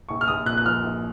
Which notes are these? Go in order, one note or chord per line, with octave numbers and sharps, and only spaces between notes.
A#1 C#6
F6
A#1 D#6
A#2 F#6
F#6
F3 F6
A#1